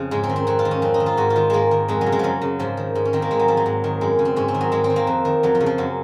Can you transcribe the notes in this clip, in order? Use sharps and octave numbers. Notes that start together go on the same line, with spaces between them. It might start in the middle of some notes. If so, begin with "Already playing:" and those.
Already playing: F2 C#3
G#2 G#3
C4
D#3
C4
F2 C4
F4
D#3
C#4
F2 C4
D#4
D#3
F4
G#2 F#4
F4
D#3
G#2 G#3 A#3
D#3
F2 G#3
F#3
C#3
G#3
F#2 F3 F#3
C#3
G#2 F3
D#3
G#2
C#4
D#3 C4
A#3
G#2 G#3
F#3
D#3 F3
F#3
G#2
D#3
F#2 G#3
C#3
C4
G#2 C#4
C4
D#3
F#3
G#2 G#3
C4
D#3
A#3
F2
D#3
F2 F#3
F3
C#3
F3
F#2 F#3